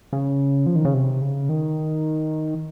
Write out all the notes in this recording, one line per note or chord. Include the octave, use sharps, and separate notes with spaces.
C#3
F3
D#3
C#3
C3
C#3
D#3